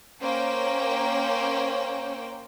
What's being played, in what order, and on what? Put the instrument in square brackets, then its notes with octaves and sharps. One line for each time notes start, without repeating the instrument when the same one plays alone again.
[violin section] A#3 C#4 A#4 C5 G5